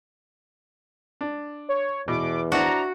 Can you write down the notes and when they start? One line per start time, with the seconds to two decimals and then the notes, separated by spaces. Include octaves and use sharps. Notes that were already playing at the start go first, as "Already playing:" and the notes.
1.21 D4
1.69 C#5
2.08 E2 B2 D6
2.52 D4 E4 F#4 C5 A#5